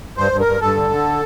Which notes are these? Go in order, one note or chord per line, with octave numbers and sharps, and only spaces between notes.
G2 C5
G2
A#4
G2
G2 A4
D3
D3